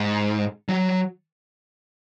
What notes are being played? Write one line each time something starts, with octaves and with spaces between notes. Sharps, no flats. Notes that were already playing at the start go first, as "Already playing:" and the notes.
Already playing: G#2
F#3